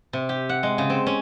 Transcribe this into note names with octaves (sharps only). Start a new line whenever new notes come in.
C3
G4
F#5
G#3
C#3
C4
C#4